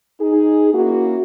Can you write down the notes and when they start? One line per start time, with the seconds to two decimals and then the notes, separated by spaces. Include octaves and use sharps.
0.20 D#4 G#4
0.74 A#3 C#4 E4 F#4